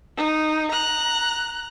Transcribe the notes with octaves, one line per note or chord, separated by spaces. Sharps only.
D#4
A#5 F#6